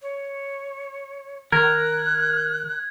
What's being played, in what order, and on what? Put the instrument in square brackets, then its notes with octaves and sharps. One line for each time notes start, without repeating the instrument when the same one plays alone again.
[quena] C#5
[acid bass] D#3 [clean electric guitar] A#4 [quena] F#6 [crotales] G#6